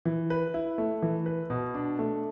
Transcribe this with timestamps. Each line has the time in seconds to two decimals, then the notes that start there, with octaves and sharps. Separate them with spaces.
0.05 E3
0.30 B4
0.54 E4
0.78 A3
1.02 E3
1.26 B4
1.50 B2
1.74 D4
1.99 A3